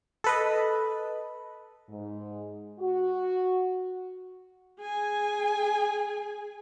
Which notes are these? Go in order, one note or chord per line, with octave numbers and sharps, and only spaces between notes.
A4 B4 D#5
G#2
F#4
G#4 G#5